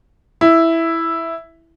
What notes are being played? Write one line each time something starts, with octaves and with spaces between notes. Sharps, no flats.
E4